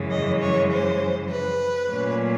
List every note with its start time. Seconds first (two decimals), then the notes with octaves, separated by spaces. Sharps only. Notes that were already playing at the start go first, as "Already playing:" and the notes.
Already playing: F#2 C#3 E3 G#3
0.10 D#5
0.40 C#5
0.71 C5
1.29 B4
1.89 A#2 F#3 A3 C#4